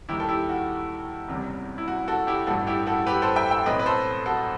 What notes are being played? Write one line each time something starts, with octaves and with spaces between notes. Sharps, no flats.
D#2 D#3 G3 E4 G4
A4
E4 G4
F#4
F#1 E2 C3 E3 G3
E4
F#4
F#4 A4
E4 G4
A1 G2 E3 A3 F#4 A4
E4 G4
F#4 A4
G4 B4
A4 C5
E5 G5
E5 G5
B1 A2 E3 A3 C4 B4 D#5
B4
A4 C5
F#4 A4